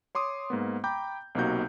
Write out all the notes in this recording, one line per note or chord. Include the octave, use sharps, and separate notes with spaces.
C#5 C6 D6 D#6
G#2 A#3 B3
G5 A#5 B5 D6 G6
B1 C3 A#3 D#4 F#4 G6